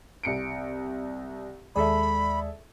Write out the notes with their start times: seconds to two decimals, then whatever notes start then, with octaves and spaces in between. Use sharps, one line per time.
0.23 C2 C#7 D7
1.76 D#2 G#3 G#4 A4 D5 E5 B5